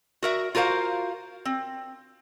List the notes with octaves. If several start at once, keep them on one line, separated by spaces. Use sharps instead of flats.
F#4 A#4 E5
F4 F#4 A#4 C5 F5
C4